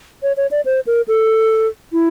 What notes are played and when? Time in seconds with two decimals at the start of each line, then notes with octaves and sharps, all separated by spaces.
0.23 C#5
0.37 C#5
0.51 D5
0.65 C5
0.87 A#4
1.08 A4
1.93 E4